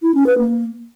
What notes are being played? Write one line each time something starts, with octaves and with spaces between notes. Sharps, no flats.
E4
C#4
B4
A#3